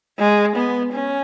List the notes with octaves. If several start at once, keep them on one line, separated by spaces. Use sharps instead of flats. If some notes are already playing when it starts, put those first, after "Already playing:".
G#3
B3
C#4